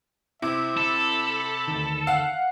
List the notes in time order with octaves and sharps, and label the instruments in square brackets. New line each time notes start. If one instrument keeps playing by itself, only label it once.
[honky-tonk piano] C3 [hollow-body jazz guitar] E4 [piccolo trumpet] E5
[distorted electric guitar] A4 [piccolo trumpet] B5
[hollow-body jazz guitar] D2 D#3
[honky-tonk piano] F5 F#5